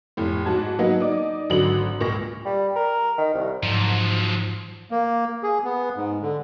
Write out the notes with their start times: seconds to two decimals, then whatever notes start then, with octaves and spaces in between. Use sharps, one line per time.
0.17 F1 A2
0.45 G#2 F#4 A5 G#6
0.79 F#3 A#3 B3 D#4 F#5
1.00 D#4 D5 D6
1.50 G#1 D3 F#3 F#7
2.00 C#2 A#2 C#6 A#6
2.46 G3
2.76 A#4
3.18 D#3
3.34 C2
3.63 G#2 F3 F#3
4.91 A#3
5.43 G#4
5.64 B3
5.96 G#2
6.22 D3